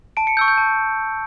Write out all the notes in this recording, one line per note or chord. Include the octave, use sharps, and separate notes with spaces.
A5 D7
C#7
C#6 E6 G6
G6
A5